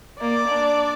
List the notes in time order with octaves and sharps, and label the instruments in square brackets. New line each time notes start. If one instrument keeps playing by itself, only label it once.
[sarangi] A#3 [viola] D5
[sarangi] D4